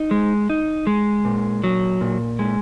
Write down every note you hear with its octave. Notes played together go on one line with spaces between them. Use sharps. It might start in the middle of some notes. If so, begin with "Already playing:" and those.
Already playing: D#4
G#3
D#4
G#3
A#2
F#3
A#2
G#3